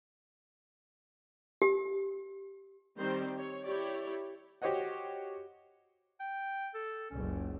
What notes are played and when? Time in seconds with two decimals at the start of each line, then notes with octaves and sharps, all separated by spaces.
1.62 G4
2.99 D#3 G3 C4 C5
3.36 C#5
3.65 E4 G4 C#5 D5
4.62 F#4 G4 C5 C#5 D#5 F#5
6.20 G5
6.74 A4
7.11 F#1 C#2 C#4